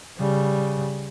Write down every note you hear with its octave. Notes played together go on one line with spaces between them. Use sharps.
C#3 G3